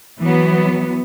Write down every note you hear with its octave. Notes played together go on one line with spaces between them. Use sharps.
E3 F#3 B3